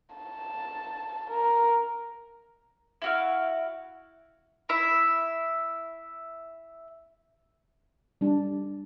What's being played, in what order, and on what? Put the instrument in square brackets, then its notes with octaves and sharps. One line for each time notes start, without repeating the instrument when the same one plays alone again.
[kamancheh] A5
A#4
[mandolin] E4 F#4 F5
E4 E5
[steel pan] G3 D4